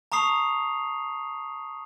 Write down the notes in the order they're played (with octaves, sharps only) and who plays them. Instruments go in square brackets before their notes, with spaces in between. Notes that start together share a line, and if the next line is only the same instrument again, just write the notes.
[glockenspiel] A5 A#5 C#6 D#6 C7 F7